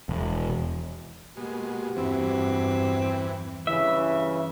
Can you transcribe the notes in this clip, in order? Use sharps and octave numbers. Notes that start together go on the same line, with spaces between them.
E1
B2 G#3 A#3 F#4 G4
E2 G2 E3 C4
G2 C#3 E3 E5